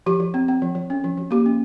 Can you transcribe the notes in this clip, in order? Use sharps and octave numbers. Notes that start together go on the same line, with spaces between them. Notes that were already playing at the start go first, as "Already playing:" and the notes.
F3 G4
F3
C4
C4
F3
F3
C#4
F3
F3
A#3 G4
C#4